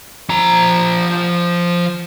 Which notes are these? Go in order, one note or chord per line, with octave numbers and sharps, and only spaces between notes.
F3 A#5